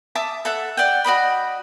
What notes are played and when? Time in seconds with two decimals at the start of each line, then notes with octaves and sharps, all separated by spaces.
0.15 E5 A5 D6 D#6
0.45 A4 E5 F#5
0.77 D5 F#5 G5
1.04 F#4 D5 D#5 B5